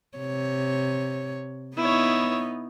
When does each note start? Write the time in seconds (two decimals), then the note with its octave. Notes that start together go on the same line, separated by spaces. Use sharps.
0.18 C3 C#5
1.77 B3 D#4 E4 C#5